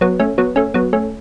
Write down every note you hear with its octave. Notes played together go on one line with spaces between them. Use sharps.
F#3 B3
A3 C#4
F#3 B3
A3 C#4
F#3 B3
A3 C#4